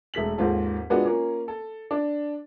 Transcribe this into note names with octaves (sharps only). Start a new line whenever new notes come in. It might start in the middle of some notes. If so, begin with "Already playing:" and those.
E1 A3 B6 F#7
D#2 G#2 C4 F4 A4
G#3 B3 D4 F4 F#4
A#3 C#4 F4
A4
D4